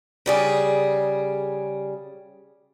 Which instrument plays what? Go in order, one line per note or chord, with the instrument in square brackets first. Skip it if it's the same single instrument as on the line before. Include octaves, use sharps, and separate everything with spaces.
[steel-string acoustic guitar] C#3 G3 G#4